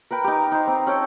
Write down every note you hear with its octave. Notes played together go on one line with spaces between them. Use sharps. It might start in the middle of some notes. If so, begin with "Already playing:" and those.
A#4 B4 G5
D#4 G4
D#4 C5
C4
C#4 A4 G5